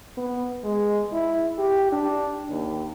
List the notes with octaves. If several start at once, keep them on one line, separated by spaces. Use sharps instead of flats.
B3
G#3
E4
G4
D4
D#2